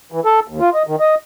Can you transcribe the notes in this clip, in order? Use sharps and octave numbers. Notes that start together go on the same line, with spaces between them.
E3
A4
D#2
F4
D#5
D#3
D#5